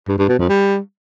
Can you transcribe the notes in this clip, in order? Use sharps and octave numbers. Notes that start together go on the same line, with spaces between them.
G2
G2
B2
F2
G3